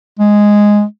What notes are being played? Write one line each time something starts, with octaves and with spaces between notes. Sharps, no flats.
G#3